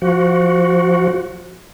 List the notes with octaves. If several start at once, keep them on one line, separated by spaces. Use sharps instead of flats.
F3 F#4